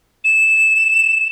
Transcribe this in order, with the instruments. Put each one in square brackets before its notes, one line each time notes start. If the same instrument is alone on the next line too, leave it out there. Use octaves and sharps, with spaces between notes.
[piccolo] E7